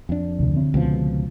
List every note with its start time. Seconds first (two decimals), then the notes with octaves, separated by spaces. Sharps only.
0.09 F2 D4
0.39 D2 C3
0.54 D3 C4
0.74 C#2 B2 F3